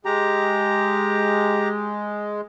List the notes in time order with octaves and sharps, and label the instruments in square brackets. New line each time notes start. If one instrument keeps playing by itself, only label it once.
[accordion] G#3 [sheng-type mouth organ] G4 A#5